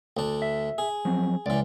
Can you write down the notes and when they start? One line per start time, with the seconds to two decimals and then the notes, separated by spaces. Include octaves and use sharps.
0.17 D2 D4
0.42 E5
0.78 G#4
1.05 F3 F#3 C4
1.46 C#2 E3 D5